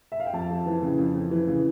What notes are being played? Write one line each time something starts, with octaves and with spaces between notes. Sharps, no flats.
E5
F5
G5
F2 A5
F2
E3
C#3
F2
F2
E3
C#3